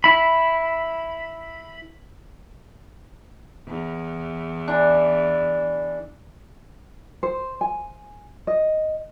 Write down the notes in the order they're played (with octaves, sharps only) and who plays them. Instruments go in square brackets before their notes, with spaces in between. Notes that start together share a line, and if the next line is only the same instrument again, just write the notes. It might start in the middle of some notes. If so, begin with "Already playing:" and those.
[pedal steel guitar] E4 B5
[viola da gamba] E2
[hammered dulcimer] E3 D4
[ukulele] C5
G#5
D#5